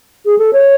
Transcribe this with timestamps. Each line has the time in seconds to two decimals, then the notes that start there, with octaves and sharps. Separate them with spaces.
0.25 G#4
0.38 A4
0.53 C#5